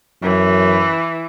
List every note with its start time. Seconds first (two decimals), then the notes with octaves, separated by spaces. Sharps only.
0.22 F#2 E3